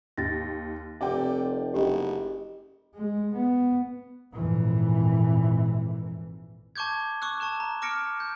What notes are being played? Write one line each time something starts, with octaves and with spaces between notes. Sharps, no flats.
D#2 A6 A#6
F1 C3 D5 G5
F#1 G4 D#5
G#3
B3
G#1 F2 A#2 E3
A5 C#6 D6 G6 G#6
C#6 D6 E6 F#6
A5 C#6 F#6 E7
A#5
D6 F6 A#6 C#7 D7
G6